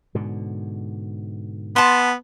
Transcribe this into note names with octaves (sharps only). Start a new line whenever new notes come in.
G#2 B2 D3
B3 A5 C6